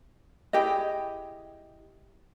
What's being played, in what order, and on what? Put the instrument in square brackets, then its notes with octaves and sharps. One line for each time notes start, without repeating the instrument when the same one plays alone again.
[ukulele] E4 G4 G#4 D#5